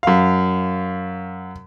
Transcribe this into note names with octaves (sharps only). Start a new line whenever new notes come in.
F#2 F5